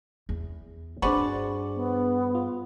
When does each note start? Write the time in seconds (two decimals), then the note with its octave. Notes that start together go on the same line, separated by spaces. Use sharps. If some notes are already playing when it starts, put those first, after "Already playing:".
0.29 E2
1.02 G2 C4 D4 F#4 G#4 B4 C5 D5
1.76 B3
2.35 F4